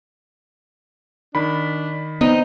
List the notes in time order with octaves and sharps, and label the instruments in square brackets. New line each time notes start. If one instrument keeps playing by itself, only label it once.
[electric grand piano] D#3 B5 [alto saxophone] D4
[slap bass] B3 [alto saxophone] C4 [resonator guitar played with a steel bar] D#4